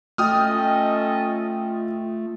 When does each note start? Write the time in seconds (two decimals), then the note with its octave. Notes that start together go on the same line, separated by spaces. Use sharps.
0.18 A3 C#4 F4 A4 D#5 G5 D#6 F6